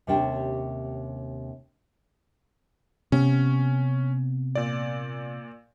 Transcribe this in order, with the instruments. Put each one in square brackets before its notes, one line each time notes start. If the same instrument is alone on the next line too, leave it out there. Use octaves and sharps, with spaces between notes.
[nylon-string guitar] D#2 C3 C#4 D4 G4 G5
[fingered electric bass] C3 B3 [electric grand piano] C#4
[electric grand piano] A#2 D5